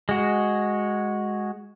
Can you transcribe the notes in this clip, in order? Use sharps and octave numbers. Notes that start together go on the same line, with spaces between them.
G#3 F#4